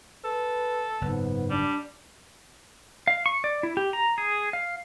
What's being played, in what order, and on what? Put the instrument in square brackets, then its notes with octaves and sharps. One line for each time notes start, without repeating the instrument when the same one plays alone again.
[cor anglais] A4 [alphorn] B4
[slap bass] F#1 [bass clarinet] G#2 [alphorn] B3
[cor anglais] G3 [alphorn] D4
[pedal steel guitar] F5
C#6
D5
E4
G4
A#5
G#4
F5